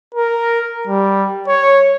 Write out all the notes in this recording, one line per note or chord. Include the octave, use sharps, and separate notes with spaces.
A#4
G3
C#5